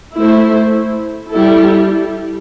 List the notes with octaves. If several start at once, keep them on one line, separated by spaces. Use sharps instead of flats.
A3 E4 C5
G3 E4 A4